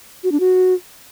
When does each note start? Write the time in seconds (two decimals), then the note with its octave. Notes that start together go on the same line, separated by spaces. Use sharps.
0.24 F#4
0.32 D4
0.40 F#4